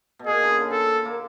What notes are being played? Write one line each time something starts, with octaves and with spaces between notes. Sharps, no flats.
B2
A#2 G#4
D3
C#3
D3
D3 A4
A#3